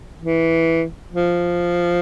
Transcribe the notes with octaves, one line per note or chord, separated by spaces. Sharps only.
E3
F3